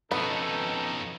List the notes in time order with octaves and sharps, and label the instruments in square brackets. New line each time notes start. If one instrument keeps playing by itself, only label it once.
[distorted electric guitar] F2 B2 [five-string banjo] B3 [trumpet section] C#4 D#4 A4